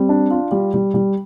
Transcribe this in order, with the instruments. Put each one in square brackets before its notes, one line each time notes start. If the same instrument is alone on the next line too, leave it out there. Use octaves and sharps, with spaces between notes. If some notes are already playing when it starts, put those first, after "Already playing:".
Already playing: [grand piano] G3 [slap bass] C4
[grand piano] D4
F4
G3
G3
G3